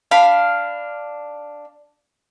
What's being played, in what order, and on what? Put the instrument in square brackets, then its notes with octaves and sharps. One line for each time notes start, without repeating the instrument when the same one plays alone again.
[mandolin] D4 F5 B5